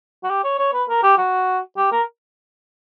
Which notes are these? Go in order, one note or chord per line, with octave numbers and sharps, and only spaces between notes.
F#4
G4
C#5
C#5
B4
A#4
G4
F#4
G4
A#4